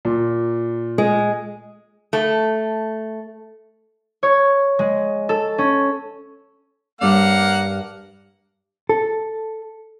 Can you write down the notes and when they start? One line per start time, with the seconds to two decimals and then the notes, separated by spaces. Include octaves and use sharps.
0.05 A#2
0.98 G#3
2.13 A3
4.23 C#5
4.79 G#3
5.29 A4
5.58 C#4
7.01 G2 A#3 D4 F#5 F6
8.89 A4